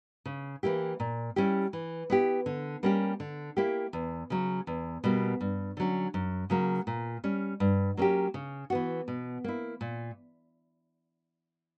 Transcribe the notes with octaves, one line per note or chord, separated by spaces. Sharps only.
C#3
E3 A#3 E4 G4
A#2
G3 C#4 E4 G4
E3
B3 E4 G4
D3
G3 A#3 C#4 G4
D3
A#3 E4 G4
E2
C#3 F#3
E2
B2 G3 A#3
G2
D3 F#3 C#4
F#2
C#3 F#3 A#3
A#2
G3 C#4
G2
F#3 A#3 C#4 G4
C#3
E3 B3 F#4
B2
A#3 E4
A#2